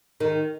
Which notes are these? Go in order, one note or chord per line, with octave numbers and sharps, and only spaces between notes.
D#3